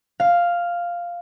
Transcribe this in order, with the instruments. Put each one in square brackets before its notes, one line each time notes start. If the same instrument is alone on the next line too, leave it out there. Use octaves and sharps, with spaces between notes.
[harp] F5